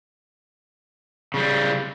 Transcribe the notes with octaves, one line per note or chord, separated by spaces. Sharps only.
C#3 G3